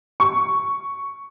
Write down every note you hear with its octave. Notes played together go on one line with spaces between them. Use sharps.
C#6